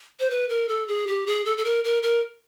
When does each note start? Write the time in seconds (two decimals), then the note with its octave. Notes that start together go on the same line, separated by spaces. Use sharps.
0.20 C5
0.30 B4
0.49 A#4
0.69 A4
0.88 G#4
1.07 G4
1.27 G#4
1.45 A4
1.57 A4
1.65 A#4
1.84 A#4
2.03 A#4